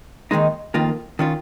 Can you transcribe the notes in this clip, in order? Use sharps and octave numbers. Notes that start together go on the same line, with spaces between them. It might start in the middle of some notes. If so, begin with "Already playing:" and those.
D#2 D#3 G#3 D#4
F2 D#3 A#3 F4
D#3 C#4 F4